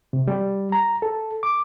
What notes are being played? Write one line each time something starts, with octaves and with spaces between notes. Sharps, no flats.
C3
G3
A#5
A4
D6